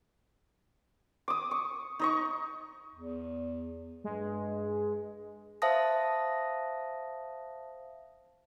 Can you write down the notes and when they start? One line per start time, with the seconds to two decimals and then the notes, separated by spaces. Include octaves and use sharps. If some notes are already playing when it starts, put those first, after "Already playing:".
1.28 D6 D#6
1.51 C#6
1.99 D#4 D#5 C#6
2.95 E2
4.04 G2 G#3
5.62 C5 E5 F5 A5 D#6 A#6